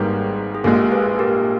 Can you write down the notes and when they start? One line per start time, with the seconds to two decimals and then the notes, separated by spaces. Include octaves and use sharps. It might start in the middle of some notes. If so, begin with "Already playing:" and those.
Already playing: G#1 G#2 G3 A#3 G#4 B4
0.54 G#4
0.64 A#1 A#2 G#3 G4 A#4
0.92 G#4 B4
1.19 G4 A#4